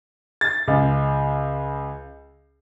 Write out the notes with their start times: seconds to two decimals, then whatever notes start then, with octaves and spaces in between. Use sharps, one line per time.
0.41 A6
0.68 C#2